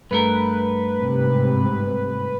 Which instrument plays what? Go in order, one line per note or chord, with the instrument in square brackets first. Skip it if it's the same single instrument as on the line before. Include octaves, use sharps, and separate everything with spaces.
[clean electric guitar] G2 A3 A#4 [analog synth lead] B4
[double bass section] G#2 C3